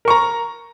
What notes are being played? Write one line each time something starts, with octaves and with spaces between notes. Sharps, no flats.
A#4 A#5 C#6